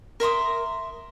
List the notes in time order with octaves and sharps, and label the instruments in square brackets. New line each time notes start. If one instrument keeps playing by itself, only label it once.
[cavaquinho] A#4 E5 C6 D#6